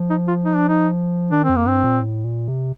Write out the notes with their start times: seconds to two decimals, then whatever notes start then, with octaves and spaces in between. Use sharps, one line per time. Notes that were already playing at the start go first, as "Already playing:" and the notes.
Already playing: F3
0.10 D#4
0.28 F4
0.45 D#4
0.57 D4
0.69 D#4
1.31 D#3 D4
1.44 C4
1.49 F2
1.56 A#3
1.66 G2 C4
1.84 A#2
2.01 A2
2.24 A#2
2.48 C3